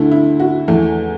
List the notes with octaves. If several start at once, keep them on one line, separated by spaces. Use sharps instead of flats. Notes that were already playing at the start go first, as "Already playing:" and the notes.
Already playing: D2 D3 A3 E4
E4
F#4
E2 E3 A3